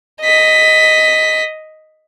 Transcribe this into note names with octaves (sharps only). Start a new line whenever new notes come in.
D#5 B6